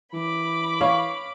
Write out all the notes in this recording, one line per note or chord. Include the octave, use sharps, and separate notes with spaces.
E3 B5 D6
C#5 F5